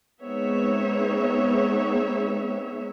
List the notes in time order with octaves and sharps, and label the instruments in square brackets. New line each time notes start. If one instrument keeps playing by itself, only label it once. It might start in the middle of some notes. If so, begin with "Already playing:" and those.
[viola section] G#3 B3 C4 D#4 C#5 E5